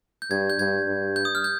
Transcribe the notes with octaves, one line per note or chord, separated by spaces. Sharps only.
G6
G2 G#6
G6
G2 G#6
G2
G6
D#6
F6
G6